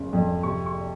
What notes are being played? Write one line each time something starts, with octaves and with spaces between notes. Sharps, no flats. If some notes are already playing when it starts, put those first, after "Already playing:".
Already playing: F#1 C#3
F2
C3 C#6
C#6